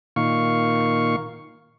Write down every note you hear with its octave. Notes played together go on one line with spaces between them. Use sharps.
A#2 D#3 F5 C#6